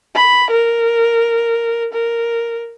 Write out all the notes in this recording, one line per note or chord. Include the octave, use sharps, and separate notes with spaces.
B5
A#4
A#4